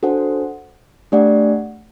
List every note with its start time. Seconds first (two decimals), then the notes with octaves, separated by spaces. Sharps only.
0.03 D4 F#4 A4 C5 F#5
1.12 A3 D4 G4 D5 F#5